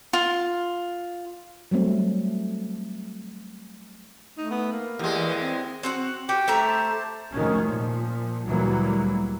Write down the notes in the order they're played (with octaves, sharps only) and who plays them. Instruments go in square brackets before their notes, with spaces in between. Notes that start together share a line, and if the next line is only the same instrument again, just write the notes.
[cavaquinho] F4
[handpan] F#3 G3 A3 C4
[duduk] A3 [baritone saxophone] D#4
[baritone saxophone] B3
A#3
[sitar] E2 G#3 [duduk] G4
[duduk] E3
C4
[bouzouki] C4 F#4 F#5
[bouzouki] F#4 [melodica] G4 G5
[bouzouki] A3 E5 A#5
[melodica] C5 A5
[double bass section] F1 G#2 D#3 F#3 C#4
A#2 F3
D2 A#2 E3 F#3 G3 A#3